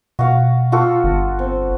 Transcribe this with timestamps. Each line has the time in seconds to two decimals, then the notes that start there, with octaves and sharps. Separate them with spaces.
0.19 B2 F#4 F5
0.72 F4 F#4 A4
1.04 G1
1.39 C4